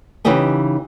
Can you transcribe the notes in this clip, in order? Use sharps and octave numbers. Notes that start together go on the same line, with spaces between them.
C#3 E3 D#4 G4 D#5 G#5